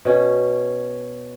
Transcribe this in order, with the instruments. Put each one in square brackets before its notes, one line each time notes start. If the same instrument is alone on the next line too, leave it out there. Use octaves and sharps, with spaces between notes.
[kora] B2 C#4